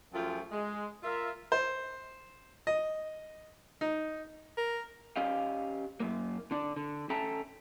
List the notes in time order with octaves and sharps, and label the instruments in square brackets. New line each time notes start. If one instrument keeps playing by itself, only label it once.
[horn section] F#2 F3 A3 F4 G#4 G5
G#3
F4 A#4 E5
[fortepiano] C5
D#5
D#4
[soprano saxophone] A#4
[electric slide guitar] C#4 G4 D#5 F5
F#2 A#3
D3 D4
D3
C#4 A4 E5 G5 A5 A#5